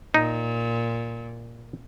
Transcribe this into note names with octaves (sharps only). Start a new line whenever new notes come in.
A#2 D#4